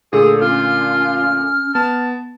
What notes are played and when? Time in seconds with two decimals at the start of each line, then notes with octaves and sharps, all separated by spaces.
0.13 A#2 D3 A3 G#4 A4
0.41 C#4 F4 F6
1.75 B3 A5